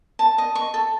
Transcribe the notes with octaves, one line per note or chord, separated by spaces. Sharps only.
A5
D#5
C#6
A4